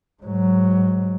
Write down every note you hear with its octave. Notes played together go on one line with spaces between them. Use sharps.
G#2 F#3